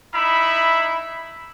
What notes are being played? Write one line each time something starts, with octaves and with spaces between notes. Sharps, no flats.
D#4 E4 E5 B5